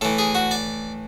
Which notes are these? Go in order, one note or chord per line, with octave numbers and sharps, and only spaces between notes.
A2 E3 A4
G#4
F#4
D5